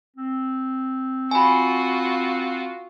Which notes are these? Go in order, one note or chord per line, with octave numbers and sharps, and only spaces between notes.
C4
F4 F#4 G#5 B5